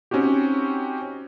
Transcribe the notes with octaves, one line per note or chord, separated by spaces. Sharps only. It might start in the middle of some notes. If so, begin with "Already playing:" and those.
C4 C#4 D#4 F#4 G4